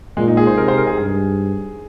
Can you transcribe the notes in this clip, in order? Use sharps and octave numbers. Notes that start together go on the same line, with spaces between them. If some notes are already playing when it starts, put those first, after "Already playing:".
A#2 G#3
D#4
G#4
C5
C3 A#4
C5
A#4
G#4
G2 G#4